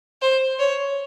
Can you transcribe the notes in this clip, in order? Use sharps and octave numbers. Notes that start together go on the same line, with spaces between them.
C5
C#5